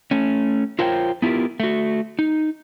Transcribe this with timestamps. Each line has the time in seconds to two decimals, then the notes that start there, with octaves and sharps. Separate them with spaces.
0.11 A3 C#4
0.79 F4 A#4 C5 C#5 F#5 G5
1.22 B3 E4 F4 G4 A#4
1.60 A3 F#4
2.19 D#4